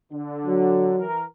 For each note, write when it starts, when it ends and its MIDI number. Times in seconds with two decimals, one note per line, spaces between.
0.12 0.93 50
0.46 1.04 54
0.99 1.23 52
0.99 1.23 70